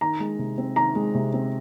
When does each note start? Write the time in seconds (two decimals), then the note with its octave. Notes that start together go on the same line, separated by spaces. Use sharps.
0.01 D#3 A#5
0.20 G#3
0.39 C3
0.58 C4
0.76 D#3 A#5
0.95 G#3
1.15 C3
1.34 C4